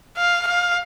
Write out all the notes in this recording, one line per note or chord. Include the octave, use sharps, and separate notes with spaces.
F5
F5